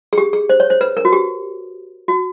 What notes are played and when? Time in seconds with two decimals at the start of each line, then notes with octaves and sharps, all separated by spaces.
0.13 G#4
0.18 G4
0.33 G#4
0.49 C5
0.60 C#5
0.70 C5
0.81 B4
0.97 A#4
1.05 F#4
1.12 G4
2.08 F#4